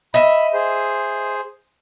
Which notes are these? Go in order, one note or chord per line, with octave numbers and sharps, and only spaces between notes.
D#5 E5 B5
G#4 C5